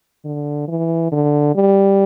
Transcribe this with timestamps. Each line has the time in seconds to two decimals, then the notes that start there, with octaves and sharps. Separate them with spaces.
0.25 D3
0.68 E3
1.12 D3
1.55 G3